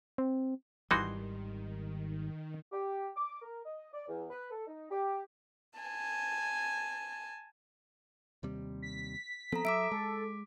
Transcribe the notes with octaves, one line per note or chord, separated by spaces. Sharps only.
C4
G#1 C#2 D#3 E3 G3 D#4 F#4 C6
G4
D6
A#4
D#5
D5
E2
B4
A4
D#4
G4
G#5 A5
D#2 C3 G3
B6
F3 B3 C4 A4 A#5
F#3 E5 D6 B6 D7
G#3 A4